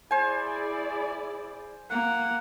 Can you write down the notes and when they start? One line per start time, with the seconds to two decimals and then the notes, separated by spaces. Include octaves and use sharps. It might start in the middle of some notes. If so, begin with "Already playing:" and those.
0.11 E4 G#4 C5 D5 G#5
1.91 A#3 F#5